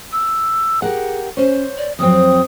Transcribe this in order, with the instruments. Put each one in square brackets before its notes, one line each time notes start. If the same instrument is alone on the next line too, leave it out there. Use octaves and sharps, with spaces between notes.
[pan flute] E6
[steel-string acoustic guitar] G4 A#4 F#5 [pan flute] G#4
[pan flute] C#4 [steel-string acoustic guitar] C5 C#5
[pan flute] D5
[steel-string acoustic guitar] F2 F#3 C4 [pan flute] D#6